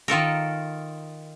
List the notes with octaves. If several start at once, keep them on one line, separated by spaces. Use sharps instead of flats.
D#3 F4 A4 A#4